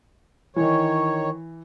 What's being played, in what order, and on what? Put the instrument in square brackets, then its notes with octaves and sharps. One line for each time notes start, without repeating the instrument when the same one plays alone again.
[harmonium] D#3 C#5 [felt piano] E3